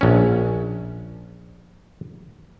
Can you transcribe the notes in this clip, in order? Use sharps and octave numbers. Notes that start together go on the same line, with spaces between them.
A#1 C#4